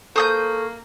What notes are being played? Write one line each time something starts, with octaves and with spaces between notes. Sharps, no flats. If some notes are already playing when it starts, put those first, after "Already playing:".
A#3 A4 C5 C#6 D#6 G6